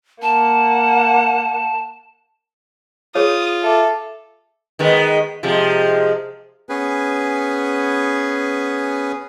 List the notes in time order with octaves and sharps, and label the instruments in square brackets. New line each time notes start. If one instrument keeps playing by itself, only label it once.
[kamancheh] A#3 F#5 [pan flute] A5
[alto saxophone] F4 [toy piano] G#4 C#5 [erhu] D#6
[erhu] A4 [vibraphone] E5 D6
[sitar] D#3 G#3 B3
C3 F3 G#3
[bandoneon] B3 C#4 G#4 B4 G#5